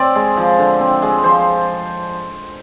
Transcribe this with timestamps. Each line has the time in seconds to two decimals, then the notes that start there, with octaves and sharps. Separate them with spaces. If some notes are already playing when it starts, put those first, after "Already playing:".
Already playing: C4 D5
0.15 G#3
0.37 F3
0.59 D3
0.80 C4
1.02 G#3
1.24 F3 C5